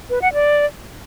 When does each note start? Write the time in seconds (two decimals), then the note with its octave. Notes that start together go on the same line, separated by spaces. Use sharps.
0.10 B4
0.22 F#5
0.33 D5